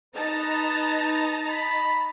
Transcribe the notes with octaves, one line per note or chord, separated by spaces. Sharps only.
D#4 B4 A5 A#5
B5